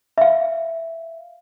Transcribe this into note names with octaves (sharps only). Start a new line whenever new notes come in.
E5 F5